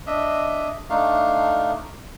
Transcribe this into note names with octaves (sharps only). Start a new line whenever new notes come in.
D4 D#5 E5
A3 D4 D#4 F5